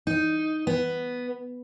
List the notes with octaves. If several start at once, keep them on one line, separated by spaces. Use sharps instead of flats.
D#4
B3